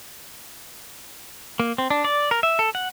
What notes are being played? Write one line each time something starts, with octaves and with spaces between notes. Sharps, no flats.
A#3
C4
D4
D5
A#4
E5
A4
F#5